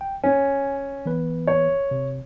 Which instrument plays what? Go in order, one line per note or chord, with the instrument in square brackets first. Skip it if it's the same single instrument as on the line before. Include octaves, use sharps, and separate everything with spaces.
[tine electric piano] G5
[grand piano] C#4 [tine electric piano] G#5
[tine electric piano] E3 B3 B4
[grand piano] C#5
[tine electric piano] C3